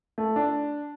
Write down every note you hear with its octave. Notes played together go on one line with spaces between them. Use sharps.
A3
D4